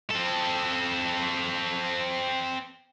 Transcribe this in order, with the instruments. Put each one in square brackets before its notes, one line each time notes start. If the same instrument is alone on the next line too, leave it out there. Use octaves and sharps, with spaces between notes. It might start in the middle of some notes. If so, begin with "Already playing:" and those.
[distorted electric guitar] C4 A4